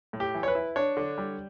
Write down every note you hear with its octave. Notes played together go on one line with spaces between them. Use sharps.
A2
G4
E3
C#5
B4
E4
D4 C#5
D3
G3